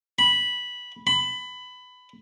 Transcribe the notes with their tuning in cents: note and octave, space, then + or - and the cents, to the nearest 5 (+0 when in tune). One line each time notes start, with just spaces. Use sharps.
B5 -10
B5 +20